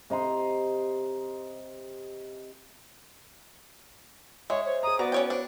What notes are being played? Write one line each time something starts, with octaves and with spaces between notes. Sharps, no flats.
C3 D#5 A#5 C6
G#3 C#5 E5
C5 C#5
G#4 A#5 D#6
B3 F#4 D5 A#5
C#4 C#5 G5
D4